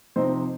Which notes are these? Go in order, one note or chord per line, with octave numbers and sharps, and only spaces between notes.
C3 F3 C4 D#4 C5